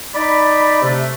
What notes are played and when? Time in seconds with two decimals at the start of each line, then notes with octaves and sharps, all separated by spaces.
0.15 D#4 D5 B5
0.82 C3 A3